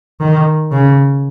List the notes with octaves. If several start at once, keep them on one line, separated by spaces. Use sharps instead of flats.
D#3
C#3